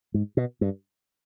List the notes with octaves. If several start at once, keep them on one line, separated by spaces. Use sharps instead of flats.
G#2
B2
G2